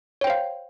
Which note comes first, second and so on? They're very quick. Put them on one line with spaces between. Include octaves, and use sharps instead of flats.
C#5 G5 C5 F5